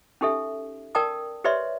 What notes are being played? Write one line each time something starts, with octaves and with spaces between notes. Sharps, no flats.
C#4 D#4 G4 A4 E5
A#4 D5 G5 A5 D#6
G4 B4 C#5 D5 E5 C6